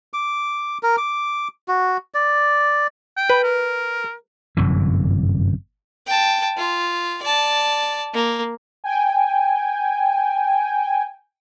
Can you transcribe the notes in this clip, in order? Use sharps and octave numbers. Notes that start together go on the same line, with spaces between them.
D6
A#4
D6
F#4
D5
G5
B4
A#4
G1 F#2 C3 E3
G5 A5
F4
D5 A5
A#3
G5 G#5